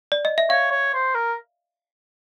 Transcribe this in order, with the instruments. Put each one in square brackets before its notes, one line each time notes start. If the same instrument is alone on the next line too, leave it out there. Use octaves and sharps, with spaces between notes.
[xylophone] D5
D#5
E5
[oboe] C#5 [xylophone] F5
[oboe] C#5
C5
A#4